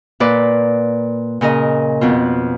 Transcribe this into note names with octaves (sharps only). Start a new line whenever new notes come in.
A#2 B4 D5
A#2 C#3 A#4 D#5
F2 B2 F4